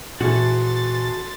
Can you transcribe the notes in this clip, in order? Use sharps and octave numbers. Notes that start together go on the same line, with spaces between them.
A#2 E3 F#4 G#4 A4 C6 A6